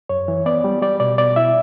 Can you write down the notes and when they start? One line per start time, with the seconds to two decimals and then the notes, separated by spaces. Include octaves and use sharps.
0.09 F#2 C#5
0.28 E3
0.46 B3 D5
0.64 G3
0.82 G3 D5
1.00 B2 D5
1.18 B2 D5
1.36 E4 E5